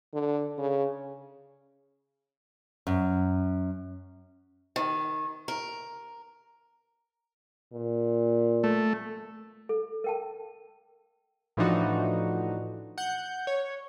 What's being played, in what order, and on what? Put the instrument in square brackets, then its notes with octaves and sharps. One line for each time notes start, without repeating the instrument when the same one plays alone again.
[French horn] D3
C#3
[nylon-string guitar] F#2
[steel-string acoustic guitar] D#3
A#4
[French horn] A#2
[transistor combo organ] A3
[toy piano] A4
A#4 G5 A5
[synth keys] A2 E3 F3 D4 D#4 F#4
F#5 G6
C#5